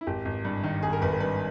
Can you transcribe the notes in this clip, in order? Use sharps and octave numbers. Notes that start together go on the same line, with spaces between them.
E4
G#1 G4
G#1
G2
D#3
G#1 G#4
A#4
G#1 B4
A#4
G2 B4